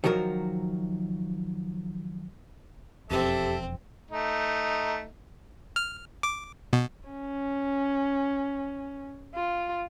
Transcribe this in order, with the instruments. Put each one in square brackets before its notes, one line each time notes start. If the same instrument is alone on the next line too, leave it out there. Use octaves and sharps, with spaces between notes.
[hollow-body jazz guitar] D#3 F3 F#3 F#4 A#4
[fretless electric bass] E1 F2 [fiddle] C4 [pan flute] G4 [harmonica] A4 E5
[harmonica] A3 D#4
[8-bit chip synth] F6
D6
B2
[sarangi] C#4
F4